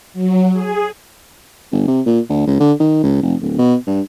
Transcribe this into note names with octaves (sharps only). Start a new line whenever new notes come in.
F#3
G#4
G1
C3
A#2
D2
C#2
D3
D#3
C#2
F1
D1
B2
G2